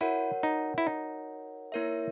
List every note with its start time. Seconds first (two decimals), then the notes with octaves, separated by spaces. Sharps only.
0.01 E4 F#4 A#4 C#5 F#5
0.43 D#4
0.78 E4
0.87 D#4
1.72 A#3 E4 A#4 C#5 E5